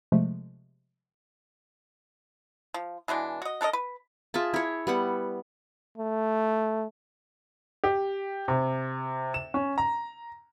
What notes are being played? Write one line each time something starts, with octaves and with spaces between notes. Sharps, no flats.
C3 F3 G#3 A3
F3
B2 E3 G#3 D4
F#4 D#5
D4 A4 A#4 D#5
B4
F4 G#4 E5 A5
E4 C#5
G3 B3 F#5
A3
G4
C3
E7
C#4
A#5